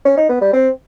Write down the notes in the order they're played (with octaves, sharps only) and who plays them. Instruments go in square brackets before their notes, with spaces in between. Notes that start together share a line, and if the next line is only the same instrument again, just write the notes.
[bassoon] C#4
D#4
B3
G3
C4